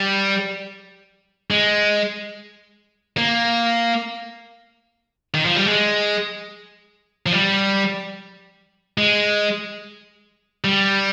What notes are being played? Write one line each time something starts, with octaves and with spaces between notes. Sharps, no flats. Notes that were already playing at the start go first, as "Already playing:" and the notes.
Already playing: G3
G#3
A#3
D#3
F3
G3
G#3
F3
G3
G#3
G3